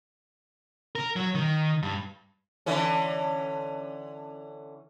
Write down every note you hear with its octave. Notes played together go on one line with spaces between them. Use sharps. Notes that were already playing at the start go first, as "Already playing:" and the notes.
A#4
F#3
D#3
G2
D3 E3 C#4